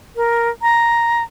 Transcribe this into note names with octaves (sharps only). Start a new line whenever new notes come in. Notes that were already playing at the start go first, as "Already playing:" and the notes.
A#4
A#5